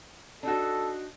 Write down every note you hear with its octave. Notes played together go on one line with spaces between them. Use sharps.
D4 D#4 F#4 A4